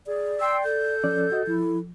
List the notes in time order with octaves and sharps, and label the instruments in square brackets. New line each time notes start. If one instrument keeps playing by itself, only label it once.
[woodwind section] G#4 [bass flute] D5
[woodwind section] G5 C6 [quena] E6
[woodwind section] A4 [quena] G6
[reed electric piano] F3 C#4 D5
F#4 D#5
[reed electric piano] F3 [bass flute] E4